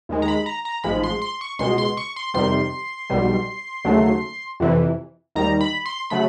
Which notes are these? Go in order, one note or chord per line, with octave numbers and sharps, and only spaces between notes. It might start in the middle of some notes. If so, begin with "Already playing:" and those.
D#2 D#3 G#3
A#5
B5
A#5
A#5
A1 G#2 F3 G#3 B5
C6
C6
C#6
C#2 B2 G#3 C6
C6
C#6
C6
F2 C3 D#3 G3 C6
B1 B2 G3
D#2 C#3 F#3 A3
F2 C3 E3
D#2 D#3 G3 A#5
B5
C6
C#3 F#3 A3 B5